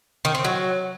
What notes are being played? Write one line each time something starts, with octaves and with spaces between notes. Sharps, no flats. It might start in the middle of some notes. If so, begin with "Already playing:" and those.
D#3
C4
F#3